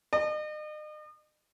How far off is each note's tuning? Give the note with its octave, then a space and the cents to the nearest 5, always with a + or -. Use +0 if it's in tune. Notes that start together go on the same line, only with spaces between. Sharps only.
D#5 -40